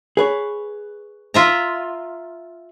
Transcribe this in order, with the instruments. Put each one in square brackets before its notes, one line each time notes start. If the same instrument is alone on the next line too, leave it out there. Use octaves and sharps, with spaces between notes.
[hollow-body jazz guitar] G#4 B4 C#5
[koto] F4 E5 A#5